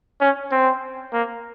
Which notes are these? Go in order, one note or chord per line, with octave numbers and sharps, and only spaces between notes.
C#4
C4
A#3